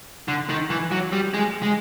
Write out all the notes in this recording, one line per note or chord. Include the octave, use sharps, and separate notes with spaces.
D3
D#3
E3
F#3
G3
G#3
G#3